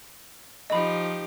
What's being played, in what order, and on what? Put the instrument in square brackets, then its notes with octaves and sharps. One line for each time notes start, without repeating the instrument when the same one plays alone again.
[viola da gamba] F3 D#4 G4 [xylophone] D#5 B5